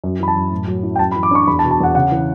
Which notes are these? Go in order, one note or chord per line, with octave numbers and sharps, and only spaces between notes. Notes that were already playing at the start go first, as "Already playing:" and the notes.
F#2
E3 B5
A5
F#2
A2
F#3
E4
G5
F#2 A5
B5
E3
D6
D4 C#6
E2 B5
A5
B2
A5
E2 F#5
C#3 F#5
E3